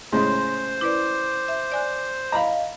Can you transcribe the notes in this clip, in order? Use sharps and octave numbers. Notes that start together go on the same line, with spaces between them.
A2 C#3 G#3 C5 C6
E4 B4 D5 D6
E5
D5 G#5 F#6
D#5 F5 A#5 B5